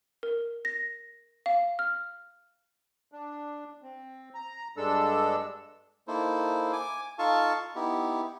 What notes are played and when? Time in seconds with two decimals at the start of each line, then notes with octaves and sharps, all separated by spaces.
0.23 A#4
0.65 A#6
1.46 F5
1.79 F6
3.12 D4
3.83 C4
4.35 A#5
4.77 G2 G#3 D4 A4 E6
6.08 A#3 D#4 E4 A4 C5
6.73 G#5 D6
7.19 D#4 F4 A4 F5 A5 C#6
7.75 B3 D#4 E4 G4